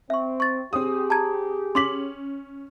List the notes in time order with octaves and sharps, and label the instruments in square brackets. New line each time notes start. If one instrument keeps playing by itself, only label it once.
[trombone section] C4 [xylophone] E5 C#6
[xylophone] C#6 A6
[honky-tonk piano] C4 D#6 [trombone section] G4 G#4
[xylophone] A5 A#5 G#6
[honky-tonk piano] C#4 F#7 [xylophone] C6 D6 B6